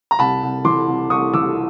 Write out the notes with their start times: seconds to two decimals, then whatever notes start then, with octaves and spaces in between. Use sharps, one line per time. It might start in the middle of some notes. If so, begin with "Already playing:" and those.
0.11 A#5
0.19 C2 A5 B5
0.43 C2
0.65 E3 C6 D6
0.88 C2
1.10 C2 C#6 D#6
1.33 E3 D6 E6